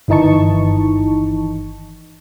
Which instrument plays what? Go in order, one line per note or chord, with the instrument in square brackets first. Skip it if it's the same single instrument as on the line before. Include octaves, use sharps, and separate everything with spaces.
[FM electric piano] G1 D#3 E3 D#4 A5 C#6